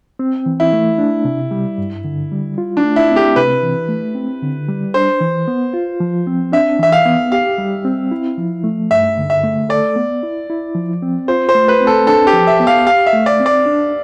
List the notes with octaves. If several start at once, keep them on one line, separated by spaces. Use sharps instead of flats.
C4
E3
E4
A3
D4
C3
G3
G2
D3
G3
F4
D4
A3
E4
C4
G4
C3 B4
E3
A3
C4
D3
G3
D4 C5
E3
B3
F4
F3
C4
D4 E5
E3 E5
F5
B3
G4 F5
G3
C4
E4
F3
A3
G2 E5
D3
E5
A3
A4 D5
B3
E4
E4
F3
C4
F4 C5
C5
A3
B4
C4
A4
D4 A4
G4
F3
E5
B3
F5
G4 F5
E5
A3
D5
C4
D5
D4